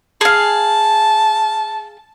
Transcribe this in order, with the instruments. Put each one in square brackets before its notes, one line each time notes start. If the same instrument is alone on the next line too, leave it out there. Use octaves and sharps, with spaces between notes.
[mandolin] G#4 F5 [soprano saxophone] A5